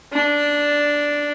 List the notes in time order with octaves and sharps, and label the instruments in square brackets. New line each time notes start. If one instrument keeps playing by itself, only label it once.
[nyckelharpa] D4